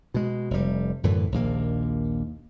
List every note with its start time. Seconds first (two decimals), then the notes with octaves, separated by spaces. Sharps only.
0.14 B2 G#3
0.51 F1 G3
1.03 F#2 A2 D3 E3
1.32 A#1 D#2 A#3